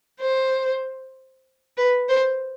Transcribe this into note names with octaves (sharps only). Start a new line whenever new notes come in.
C5
B4
C5